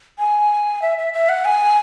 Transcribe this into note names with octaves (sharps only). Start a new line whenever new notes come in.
G#5
E5
E5
E5
F#5
G#5